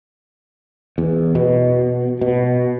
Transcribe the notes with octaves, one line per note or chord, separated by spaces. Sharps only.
E2
B2
B2